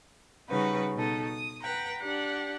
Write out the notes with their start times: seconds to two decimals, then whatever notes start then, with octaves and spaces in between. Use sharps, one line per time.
0.49 C#3 G3 D#4 F#4 B4
0.95 B2 D#4 A4 D#6
1.24 D#6
1.62 B4 F#5 G5 A#5
1.99 D4 G4 F#5